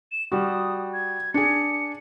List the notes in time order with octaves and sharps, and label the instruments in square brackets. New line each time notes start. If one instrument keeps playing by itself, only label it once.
[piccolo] E7
[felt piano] G3 F#4 [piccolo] D#6
[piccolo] G#6
[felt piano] D4 G#4 [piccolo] C#7